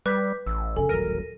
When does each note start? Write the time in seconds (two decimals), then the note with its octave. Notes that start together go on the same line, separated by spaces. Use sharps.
0.06 G3 B4 D6 G6 B6
0.46 A1 E6
0.76 F1 C#3 A4 G#5
0.89 D#1 A1 F#3 A#4 A#6 D#7